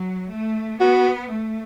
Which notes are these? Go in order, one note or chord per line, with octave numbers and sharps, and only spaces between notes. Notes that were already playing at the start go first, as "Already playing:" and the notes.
Already playing: F#3
A3
B3 F#4
A3